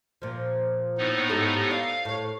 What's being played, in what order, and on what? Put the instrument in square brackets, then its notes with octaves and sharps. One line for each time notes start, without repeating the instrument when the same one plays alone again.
[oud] A#2 F3
[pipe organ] A2 B3 D#4
[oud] G#2 G4 A4
[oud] D5 [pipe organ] F5
[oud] A2 C#5